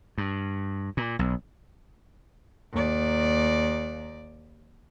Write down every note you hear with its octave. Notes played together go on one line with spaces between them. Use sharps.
G2
A#2
B1
D#2 D5